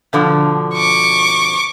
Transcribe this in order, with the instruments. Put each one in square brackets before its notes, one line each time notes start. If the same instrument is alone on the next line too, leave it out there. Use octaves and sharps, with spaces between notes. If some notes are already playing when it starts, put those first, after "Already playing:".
[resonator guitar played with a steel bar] B2 D3 F3
[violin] C#6 D6